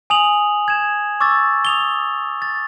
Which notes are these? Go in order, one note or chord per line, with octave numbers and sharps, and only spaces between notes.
G#5 D#6 F7 F#7
G#6 E7
C#6 D6 E6 A6
D#6 F7 G7
A6